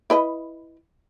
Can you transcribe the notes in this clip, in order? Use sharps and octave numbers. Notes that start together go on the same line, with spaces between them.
E4 B4 D#5